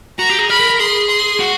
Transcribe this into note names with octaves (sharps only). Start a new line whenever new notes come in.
F#4 A#5
G4
G#4
A#4 B5
A#4
A#4
G#4 C6
C6
F#4